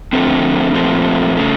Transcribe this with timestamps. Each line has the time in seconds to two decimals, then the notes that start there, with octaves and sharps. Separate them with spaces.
0.13 F2 D3 F3 A3 C4
0.74 A#2 F3 A3 C4
1.37 C#3 A3